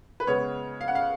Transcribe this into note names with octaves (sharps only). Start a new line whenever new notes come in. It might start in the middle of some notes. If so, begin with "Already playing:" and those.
B4
C#3 G#3 B3 C#5
F5
F#5
F5